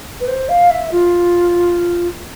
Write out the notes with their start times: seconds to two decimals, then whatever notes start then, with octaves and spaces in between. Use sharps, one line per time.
0.20 B4
0.28 C5
0.49 F5
0.70 E5
0.92 F4